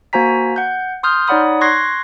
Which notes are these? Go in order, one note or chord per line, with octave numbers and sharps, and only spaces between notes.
A#3 F#4 C5 G#5 A#5 B6
F#5 G6
C6 D#6 F6 G6
D#4 C#5 D5 F#5 B5 D#6
C6 C#6 F#6 G#6 A#6 C7